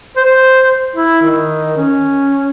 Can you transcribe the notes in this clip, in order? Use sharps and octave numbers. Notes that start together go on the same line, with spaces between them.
C5
E4
D#3
C#4